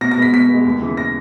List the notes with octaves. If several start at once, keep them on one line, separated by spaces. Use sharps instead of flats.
B2 A#6
A#6
G#3 B3 B6
B2 B6
G#3 B3
D#2
C#3 E3
A#6